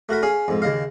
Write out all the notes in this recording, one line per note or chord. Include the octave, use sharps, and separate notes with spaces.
A3 F#4 A#4 B5
C#4 G#4 F5 D#6
F2 G#2
D#2 C#3 D#5 F5